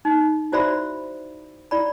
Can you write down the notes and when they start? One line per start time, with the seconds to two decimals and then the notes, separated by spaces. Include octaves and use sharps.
0.05 D#4
0.52 E4 F#4 C5 D5 E5 B5
1.71 E4 D5 B5